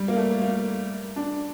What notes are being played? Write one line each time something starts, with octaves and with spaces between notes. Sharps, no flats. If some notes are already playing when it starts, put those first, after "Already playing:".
Already playing: G3
A#3
A3
A#3
D4